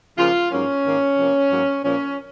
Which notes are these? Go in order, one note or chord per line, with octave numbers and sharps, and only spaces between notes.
C#3 F3 A#3 F4
G#2 F#3 A#3 C#4
G#2 D#3 A#3
C3 F3 A#3
G#2 F#3 A#3
A#2 F3 A#3 C#4